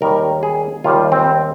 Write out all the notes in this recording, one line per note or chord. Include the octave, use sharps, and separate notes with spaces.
D#2 D#3 G3 A#4
G#4
D#2 D#3 G3 F4
C4